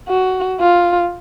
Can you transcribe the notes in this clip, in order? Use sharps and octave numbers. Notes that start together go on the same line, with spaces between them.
F#4
F4